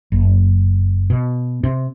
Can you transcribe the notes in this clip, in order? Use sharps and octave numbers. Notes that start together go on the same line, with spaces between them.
F#1
B2
C3